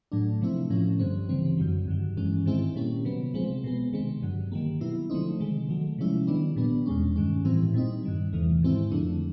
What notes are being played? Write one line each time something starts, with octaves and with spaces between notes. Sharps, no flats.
A2 F#3 A3 D4
C3 F3 A3 C4 E4
A2 F3 A3 C#4
G2 D3 G3 C4
C#3 E3 G3 C4
F#2 D3 F#3
G2 D#3 F#3
G2 E3 G#3 C#4
G#2 D#3 G#3 C4 E4
A#2 G3 A#3 C#4
C3 D#3 F#3 B3
C3 F3 G#3 C4
B2 G#3 B3
C3 D#3 G#3 C4
G2 D3 F#3
D#3 G3 A#3
B2 F#3 B3 E4
D3 F3 A3 C4 D#4
C3 D#3 G#3
D#3 F#3 A3
C3 F3 G#3 C#4 E4
D#3 G3 B3 D4
A#2 G3 B3 D4
E2 B2 G#3 C#4
G2 D#3 G#3 C#4
A2 E3 G3 C4 E4
A#2 G3 C4 D#4
G2 D#3 G3
E2 C3 E3 A3
G#2 D#3 G#3 C4 E4
F2 D3 F3 A3 D4